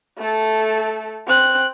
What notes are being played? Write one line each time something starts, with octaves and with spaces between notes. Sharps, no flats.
A3 A4
C4 F#6